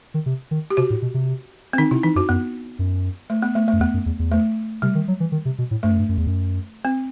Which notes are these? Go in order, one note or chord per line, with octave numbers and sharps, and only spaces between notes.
D#3
C3
D#3
G4
C3 F#4
A2
B2
C3
C4
D#3 D#4
C3 E4
E3 D#4
F#2 F#4
F#2 B3
F#2
A3
B3
A3
A3
F#2
E2 B3
F#2
E2
E2
A3
C3 G3
D#3
F#3
E3
D#3
C3
B2
A2
G2 A3
F#2
G2
F#2
E2
F#2
C4